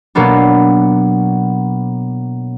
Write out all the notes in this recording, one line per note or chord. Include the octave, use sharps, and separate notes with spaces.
B2 F#3 A#3 B3 D4